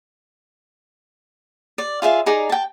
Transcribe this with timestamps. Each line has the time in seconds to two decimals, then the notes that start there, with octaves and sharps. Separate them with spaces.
1.78 D5
2.02 F4 G#4 E5 F5
2.26 D#4 G#4 D5 A#5
2.49 G5 A5